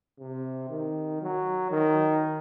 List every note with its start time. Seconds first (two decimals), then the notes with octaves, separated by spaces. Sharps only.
0.19 C3
0.70 D#3
1.21 F#3
1.71 D#3